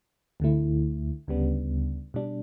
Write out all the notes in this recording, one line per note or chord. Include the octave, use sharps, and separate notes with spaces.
D2 D3 A3 E4
D2 C#3 G3 B3 D4
B2 G3 D4